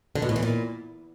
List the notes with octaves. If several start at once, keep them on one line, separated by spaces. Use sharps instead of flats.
D3
B2
A2
E3
A#2